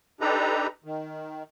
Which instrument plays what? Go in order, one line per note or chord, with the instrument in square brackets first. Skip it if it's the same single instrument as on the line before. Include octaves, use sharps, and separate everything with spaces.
[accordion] D4 D#4 G4 A4 B4 A#5
D#3